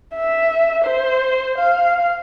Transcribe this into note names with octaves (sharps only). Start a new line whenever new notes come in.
E5
C5
F5